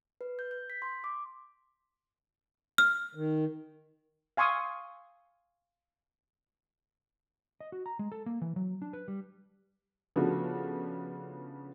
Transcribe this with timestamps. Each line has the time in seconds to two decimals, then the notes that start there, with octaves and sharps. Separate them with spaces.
0.21 B4
0.39 G6
0.51 G6
0.70 B6
0.82 C6
1.04 D6
2.78 F6
3.15 D#3
4.37 F5 G#5 C6 C#6 D#6 E6
7.61 D#5
7.72 F#4
7.86 A#5
7.99 G#3
8.12 A4
8.26 A#3
8.41 E3
8.56 F#3
8.82 D4
8.93 B4
9.08 G3
10.16 C#3 F3 A3 B3 D4 F#4